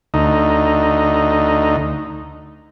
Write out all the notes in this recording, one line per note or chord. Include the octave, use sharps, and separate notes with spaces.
D2 D#4